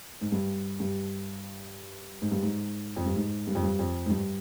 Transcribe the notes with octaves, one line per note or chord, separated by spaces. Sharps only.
G#2
G2
G2
G#2
G2
G#2
F2
G2
G#2
G2
F2
G2
F2
G#2
G2